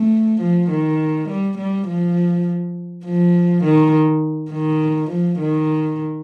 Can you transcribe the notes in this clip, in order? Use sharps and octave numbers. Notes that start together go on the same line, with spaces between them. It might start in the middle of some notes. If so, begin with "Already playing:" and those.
Already playing: A3
F3
D#3
G3
G3
F3
F3
D#3
D#3
F3
D#3